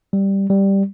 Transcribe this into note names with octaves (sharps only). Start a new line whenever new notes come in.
G3
G3